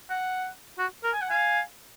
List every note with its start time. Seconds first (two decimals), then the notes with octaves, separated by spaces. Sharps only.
0.10 F#5
0.78 F#4
1.03 A#4
1.13 G#5
1.21 F#5
1.29 F5 G#5